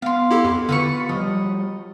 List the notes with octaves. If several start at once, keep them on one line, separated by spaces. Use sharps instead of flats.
B3 F5 C6
E4 G4 A4
F2
D3 F4 B4 C#6
F3 G3 D#5